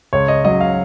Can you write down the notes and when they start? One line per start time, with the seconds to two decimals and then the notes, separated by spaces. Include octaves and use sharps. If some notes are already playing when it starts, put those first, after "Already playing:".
0.13 C#2 C#5
0.28 D#5
0.45 C#3 F#3 D#5
0.61 F5